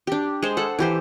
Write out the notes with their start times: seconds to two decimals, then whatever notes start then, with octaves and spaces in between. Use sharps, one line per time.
0.07 D4 G4
0.42 G#3 C5
0.57 A4 F#5
0.79 E3 G4 C5